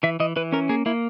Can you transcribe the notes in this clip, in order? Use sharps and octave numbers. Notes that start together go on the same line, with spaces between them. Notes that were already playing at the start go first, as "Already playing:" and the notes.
E3 E5
E3 D#5
E3 B4
C#4 A#4
A#3 G#4
A#3 E4